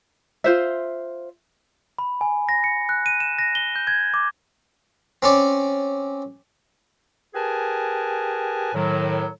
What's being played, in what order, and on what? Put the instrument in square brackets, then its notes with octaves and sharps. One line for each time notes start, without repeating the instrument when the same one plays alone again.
[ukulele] F4 C5 E5
[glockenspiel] B5
G#5
A#6
C#7
F#6
D#7
E7
A#6
G7
G6
G#6
D6
[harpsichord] C4 C#4 D5
[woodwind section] G4 G#4 A#4 B4 G#5 A5
A2 D#3 F#3